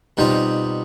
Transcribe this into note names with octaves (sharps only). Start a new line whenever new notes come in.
B2 G3 C4 D#4 F4